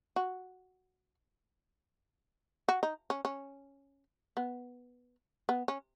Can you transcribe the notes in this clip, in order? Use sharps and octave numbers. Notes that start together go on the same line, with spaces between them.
F#4
F#4
D#4
C#4
C#4
B3
B3
C#4